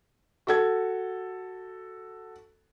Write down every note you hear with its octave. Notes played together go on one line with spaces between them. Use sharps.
F#4 A4 G#6